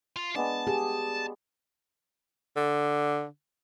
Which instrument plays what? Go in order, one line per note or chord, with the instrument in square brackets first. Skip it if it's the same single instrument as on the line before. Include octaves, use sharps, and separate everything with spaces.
[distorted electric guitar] F4
[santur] G#3 B3 D4 [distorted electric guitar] A5
[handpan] G4 G#4
[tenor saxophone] D3